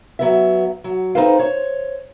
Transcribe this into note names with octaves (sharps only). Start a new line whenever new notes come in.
F#3 B3 E5
F#3
C4 D#4 A4 B4 C5 F5
C5 C#5